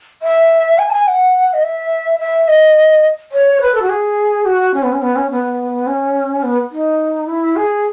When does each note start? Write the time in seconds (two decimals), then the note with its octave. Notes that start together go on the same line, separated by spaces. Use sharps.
0.22 E5
0.78 G#5
0.88 A5
0.92 G#5
1.07 F#5
1.53 D#5
1.63 E5
2.19 E5
2.48 D#5
3.32 C#5
3.61 B4
3.74 A4
3.82 F#4
3.89 G#4
4.45 F#4
4.74 C#4
4.83 B3
4.92 C#4
5.02 B3
5.16 C#4
5.30 B3
5.87 C#4
6.43 B3
6.71 D#4
7.27 E4
7.56 G#4